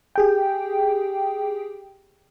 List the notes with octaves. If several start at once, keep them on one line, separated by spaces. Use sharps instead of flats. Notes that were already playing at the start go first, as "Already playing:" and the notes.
G4 G#4 G5